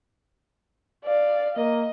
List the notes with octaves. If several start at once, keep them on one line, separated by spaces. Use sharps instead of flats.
D5 F5
A#3 D#5